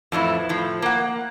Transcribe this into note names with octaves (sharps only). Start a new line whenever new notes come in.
F2 A2 E3 E4
A2 F3
A#3 F#5